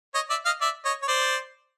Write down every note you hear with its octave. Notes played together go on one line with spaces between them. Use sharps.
C#5 D#5
D5 E5
D#5 F5
D5 E5
C#5 D#5
C#5
C5 D5